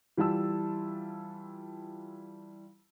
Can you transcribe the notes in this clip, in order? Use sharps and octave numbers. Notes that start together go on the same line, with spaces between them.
E3 G3 F4 A5 E6